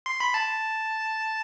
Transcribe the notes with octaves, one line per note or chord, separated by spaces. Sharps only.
C6
B5
A5